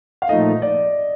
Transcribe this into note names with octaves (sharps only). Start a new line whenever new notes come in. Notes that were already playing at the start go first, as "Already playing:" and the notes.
F5
A#2 F3 A3 D#4 D#5
D5